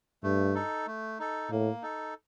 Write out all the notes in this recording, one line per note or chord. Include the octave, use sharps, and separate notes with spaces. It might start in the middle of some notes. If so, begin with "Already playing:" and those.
G2 A3
D#4 A4
A3
D#4 A4
A2 A#3
D#4 A4